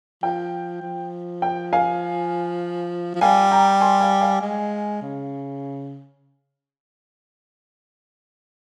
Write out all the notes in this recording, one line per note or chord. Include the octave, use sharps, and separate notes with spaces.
F3 G5
F3
G5
F5 G#5
F3
G3 F5 G#5
G5 A#5
G#5 C6
F5 G#5
F5 G#5
G#3
C#3